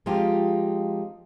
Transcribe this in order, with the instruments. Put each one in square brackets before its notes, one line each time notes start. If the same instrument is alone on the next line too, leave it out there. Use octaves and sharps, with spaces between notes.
[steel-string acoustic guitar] F3 G#3 C4 D#4 F4 G4